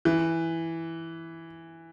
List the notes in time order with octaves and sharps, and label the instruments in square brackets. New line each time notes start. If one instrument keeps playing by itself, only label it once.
[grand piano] E3